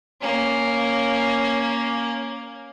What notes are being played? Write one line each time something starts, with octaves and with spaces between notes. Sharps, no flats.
A#3 C#4